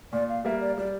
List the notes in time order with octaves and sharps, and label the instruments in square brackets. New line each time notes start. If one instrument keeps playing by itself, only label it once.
[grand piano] A#2 [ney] D5
[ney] F5
[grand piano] G3 A#3 [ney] E5
[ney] D5
[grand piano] G3 [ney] D5